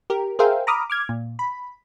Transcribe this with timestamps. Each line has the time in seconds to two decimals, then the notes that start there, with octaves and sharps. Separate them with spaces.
0.10 G4 A#4
0.39 G#4 A#4 C5 E5 F5 G5
0.67 A#5 B5 D6 D#6 F6
0.90 D6 F6 G#6
1.09 A#2
1.39 B5